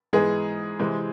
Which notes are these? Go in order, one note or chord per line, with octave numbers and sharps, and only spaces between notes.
G#2 E3 G#3 B3 G#4
C3 E3 G#3 C4